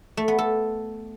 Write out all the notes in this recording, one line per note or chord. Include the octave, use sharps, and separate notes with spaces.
A3
B3
A4